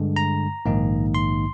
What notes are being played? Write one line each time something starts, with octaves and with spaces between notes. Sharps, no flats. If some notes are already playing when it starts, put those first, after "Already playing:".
Already playing: G2 D3 G#3
A#5
A#1 G#2 D#3 A#3 D#4
C6